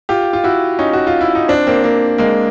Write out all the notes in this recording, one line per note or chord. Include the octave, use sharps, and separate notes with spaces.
F4 G4
F4
E4 F#4
C#4 D#4
F#4
F4
E4
D#4
C4 D4
A#3 C4
A#3 C4
G#3 A#3